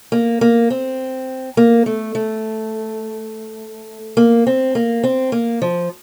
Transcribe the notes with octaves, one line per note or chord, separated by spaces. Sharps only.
A#3
A#3
C4
A#3
A3
A3
A#3
C4
A#3
C4
A#3
F3